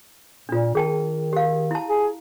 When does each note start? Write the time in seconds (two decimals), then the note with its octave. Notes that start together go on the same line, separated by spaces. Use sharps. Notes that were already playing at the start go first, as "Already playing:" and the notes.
0.49 A#2 D4 F4
0.75 D#3 G#4 G5 A5
1.33 G4 F5
1.71 E4 A5
1.89 G#4